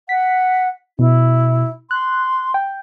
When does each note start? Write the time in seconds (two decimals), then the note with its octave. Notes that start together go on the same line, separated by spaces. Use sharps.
0.09 F#5 B6
0.99 B2 E4
1.91 C6 F#6
2.54 G5